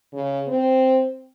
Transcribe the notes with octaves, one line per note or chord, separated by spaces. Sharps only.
C#3
C4